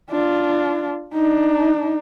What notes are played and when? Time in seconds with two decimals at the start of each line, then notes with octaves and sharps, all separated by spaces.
0.10 D4 F4
1.14 D4 D#4